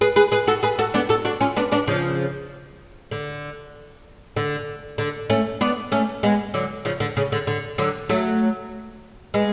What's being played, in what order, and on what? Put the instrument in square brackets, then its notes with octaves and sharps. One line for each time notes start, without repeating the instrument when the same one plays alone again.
[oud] G#4 B4
G#4 B4
G#4 B4
F#4 A4
G#4 B4
F#4 A4
B3 D4
F#4 A4
D4 F#4
C#4 F4
B3 D4
B3 D4
C#3 F3
D3
D3
D3
A3 C#4
B3 D4
A3 C#4
G#3 B3
D3 F#3
C#3 F3
D3
C#3
D3
D3
D3 F#3
F#3 A3
G#3 B3